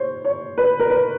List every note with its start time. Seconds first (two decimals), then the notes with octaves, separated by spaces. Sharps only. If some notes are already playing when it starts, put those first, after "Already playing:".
Already playing: C5 C#5
0.25 C#5
0.58 B4
0.79 A#4
0.90 B4